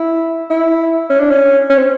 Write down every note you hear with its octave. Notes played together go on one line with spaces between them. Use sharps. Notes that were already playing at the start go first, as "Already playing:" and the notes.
Already playing: E4
E4
C#4
D4
C#4
C#4
C4